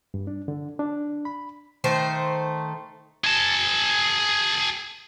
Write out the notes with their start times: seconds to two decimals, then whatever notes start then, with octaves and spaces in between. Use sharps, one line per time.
0.14 G2
0.27 D4
0.48 D3
0.79 D4
1.25 B5
1.84 D#3 A3 C5
3.25 G#4 A5